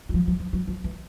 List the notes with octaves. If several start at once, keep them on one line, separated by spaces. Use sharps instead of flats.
F#3
F3
F3
F3
F#3
F3
E3